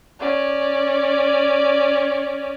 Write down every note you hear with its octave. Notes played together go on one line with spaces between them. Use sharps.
C#4 D5